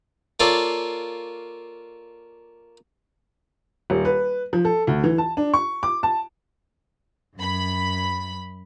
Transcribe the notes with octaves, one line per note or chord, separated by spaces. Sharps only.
A#3 F4 A4 C#5 D5
D#1
B4
F3
A4
D2
E3
A5
D4
C#6
D6
A5
F#2 B5